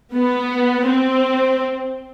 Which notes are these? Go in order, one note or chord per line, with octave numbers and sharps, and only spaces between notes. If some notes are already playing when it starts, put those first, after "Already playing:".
B3
C4